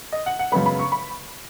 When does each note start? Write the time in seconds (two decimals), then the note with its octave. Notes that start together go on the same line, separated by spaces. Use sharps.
0.12 D#5
0.26 F#5
0.39 F#5
0.52 F#2 C#3 G#3 B3 B5
0.66 B5
0.79 C#6
0.92 B5